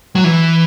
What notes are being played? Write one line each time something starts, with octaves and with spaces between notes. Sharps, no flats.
F#3
E3